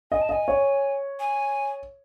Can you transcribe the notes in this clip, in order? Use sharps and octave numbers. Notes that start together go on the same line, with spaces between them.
D#5 G#5
A5
D#5 G#5
C#5
G#5